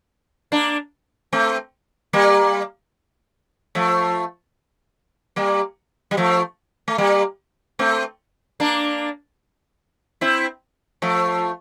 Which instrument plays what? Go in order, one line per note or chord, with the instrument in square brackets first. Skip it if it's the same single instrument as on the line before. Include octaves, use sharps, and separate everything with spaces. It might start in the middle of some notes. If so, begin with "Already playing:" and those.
[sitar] A#3 D4
A3 C4
G3 A#3
F3 A3
G3 A#3
G3
F3 A3
A3
G3 A#3
A3 C4
A#3 D4
C4 E4
F3 A3